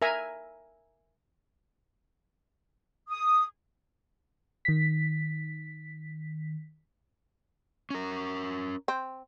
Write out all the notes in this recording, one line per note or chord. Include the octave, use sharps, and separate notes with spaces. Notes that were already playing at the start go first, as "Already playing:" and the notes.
A#4 E5 G#5 A#5
D#6
D#3 B6
C#4 A#4
C4